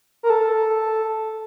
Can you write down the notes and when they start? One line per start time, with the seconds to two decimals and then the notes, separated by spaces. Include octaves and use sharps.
0.23 A#4
0.30 A4